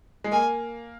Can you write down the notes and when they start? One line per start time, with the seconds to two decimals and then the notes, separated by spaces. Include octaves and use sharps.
0.24 G#3
0.32 A#3 G#5